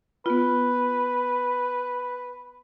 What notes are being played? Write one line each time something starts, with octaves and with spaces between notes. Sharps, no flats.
B3 F4 B4